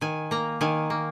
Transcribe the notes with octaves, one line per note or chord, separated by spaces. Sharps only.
D#3 G#5
A#3 A#5
D#3 G#5
A#3